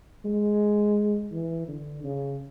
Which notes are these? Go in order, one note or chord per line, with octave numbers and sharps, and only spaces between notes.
G#3
E3
D3
C#3